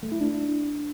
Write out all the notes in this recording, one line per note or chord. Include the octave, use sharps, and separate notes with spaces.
A3
E4
D4